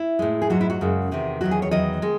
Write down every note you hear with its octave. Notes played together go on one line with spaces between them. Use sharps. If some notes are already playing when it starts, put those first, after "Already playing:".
Already playing: E4
A2 G#3
G#4
G#2 F#3 F#4
E4
F#4
F#2 C#3 G#3
E2 C3 D#3
E2 D#3 F#3 F#4
G#4
C#5
E2 D#3 F#3 D#5
D#3 G#3